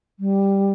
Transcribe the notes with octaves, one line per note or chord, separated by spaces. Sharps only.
G3